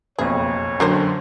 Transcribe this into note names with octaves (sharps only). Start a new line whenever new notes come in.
F#1 B1 F2 G#4 C#5
F#2 D3 F#3 D4 A#4 C5